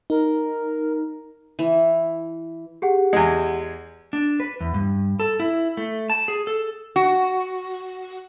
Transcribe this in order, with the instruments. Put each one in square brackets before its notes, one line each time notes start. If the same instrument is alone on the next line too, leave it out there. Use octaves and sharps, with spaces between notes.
[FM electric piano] D#4 [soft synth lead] A#4
[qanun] E3
[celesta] G4 G#4 F#5
[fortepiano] E2 G#3
[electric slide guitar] D4
B4
E2
G2
A4
E4
A3
A5
G#4
A4
[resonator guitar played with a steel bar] F#4